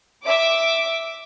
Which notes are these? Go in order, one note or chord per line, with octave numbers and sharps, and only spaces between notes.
E5 D6